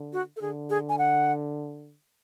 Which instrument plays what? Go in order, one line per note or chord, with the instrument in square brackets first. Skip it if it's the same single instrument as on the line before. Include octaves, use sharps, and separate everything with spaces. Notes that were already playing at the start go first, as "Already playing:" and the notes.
Already playing: [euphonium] D3
[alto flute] F#4
A4
[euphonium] D3 [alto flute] G#4
[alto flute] G#4
G#5
F#5